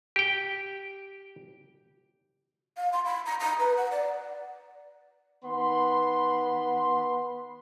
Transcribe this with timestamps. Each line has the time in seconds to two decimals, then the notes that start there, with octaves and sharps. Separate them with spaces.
0.16 G4 G5
2.77 F5
2.93 C6
3.05 B5
3.26 A#5
3.40 A#5
3.59 B4
3.77 F#5
3.92 D5
5.43 D#3 B3 B5 C6